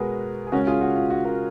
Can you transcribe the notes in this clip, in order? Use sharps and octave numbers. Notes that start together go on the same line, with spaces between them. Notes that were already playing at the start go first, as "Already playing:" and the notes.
Already playing: B2 G#3 B3 F#4 G#4 A#4 B4
G#4
C#3 G#3 C#4 F#4 A#4
F4 G#4
F#4
F4
F#4
F#4 A#4